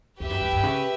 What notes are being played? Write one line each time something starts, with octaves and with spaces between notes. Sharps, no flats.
E2 G4 B4 E5
F#2
F#2
G2
C#3